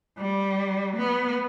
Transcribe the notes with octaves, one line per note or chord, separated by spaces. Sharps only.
G3
B3